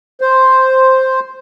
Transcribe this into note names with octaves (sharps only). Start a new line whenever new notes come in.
C5